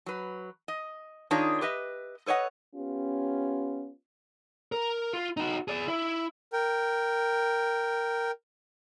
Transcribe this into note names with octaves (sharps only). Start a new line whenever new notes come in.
F#3 B4
D#5
D#3 D4 D#4 F4 G#4 C#5
G4 B4 D#5 E5
A4 B4 C#5 D#5 F#5
B3 C#4 F4 G4
A#4
F4
D#4 F#4
G#4 D5
E4
A#4 G5